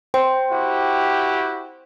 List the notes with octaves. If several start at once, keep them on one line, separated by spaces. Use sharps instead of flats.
C5 G5
E4 F#4 G4